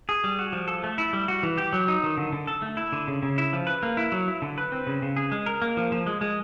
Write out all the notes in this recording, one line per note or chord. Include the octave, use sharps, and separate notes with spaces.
G#4
G3
F#4
F3
A4
A3
E4
G3
F#4
E3
G4
F#3
D#4
D#3
D3
D3
A4
A3
E4
D3
C#3
C#3
E4
F3
B4
A#3
E4
F#3
E4
D3
B4
C4
C#3
C#3
G#4
G#3
A#4
A#3
F3
F3
G#3
G#3